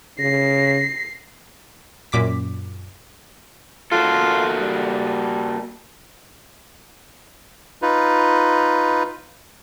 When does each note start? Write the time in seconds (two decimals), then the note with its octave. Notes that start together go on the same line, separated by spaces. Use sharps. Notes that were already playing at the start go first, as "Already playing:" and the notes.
0.19 C#3 A#6 C7
2.12 F#2 A#2 D6 B6
3.92 A#3 F4 F#4 A4
4.60 G3
7.82 D#4 F4 B4